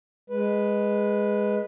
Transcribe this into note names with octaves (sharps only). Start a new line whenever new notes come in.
G#3 B4